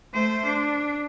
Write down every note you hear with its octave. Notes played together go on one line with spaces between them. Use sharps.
A3 C5
D4